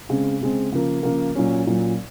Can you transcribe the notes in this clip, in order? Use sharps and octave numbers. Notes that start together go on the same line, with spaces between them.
C#3 G#3 C4
C#3 G#3 C4
C#3 F3 A#3
C#3 F3 A#3
A#2 F#3 C#4
A#2 F#3 C#4